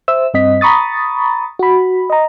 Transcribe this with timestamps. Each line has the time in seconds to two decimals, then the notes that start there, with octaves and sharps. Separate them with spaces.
0.08 C5 E5 E6
0.34 G2 C4 D#5 B6
0.61 A#5 B5 C#6 D#6 A6
1.59 F#4 B5
2.10 D#5 A#5